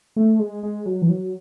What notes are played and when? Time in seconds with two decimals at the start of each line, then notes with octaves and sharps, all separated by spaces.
0.16 A3
0.39 G#3
0.63 G#3
0.86 F#3
1.02 E3
1.09 F#3